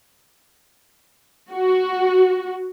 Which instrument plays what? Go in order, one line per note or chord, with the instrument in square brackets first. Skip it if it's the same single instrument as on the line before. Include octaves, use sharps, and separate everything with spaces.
[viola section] F#4